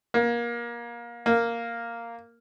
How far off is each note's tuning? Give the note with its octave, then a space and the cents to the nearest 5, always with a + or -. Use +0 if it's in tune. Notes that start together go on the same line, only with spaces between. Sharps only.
A#3 +25
A#3 -5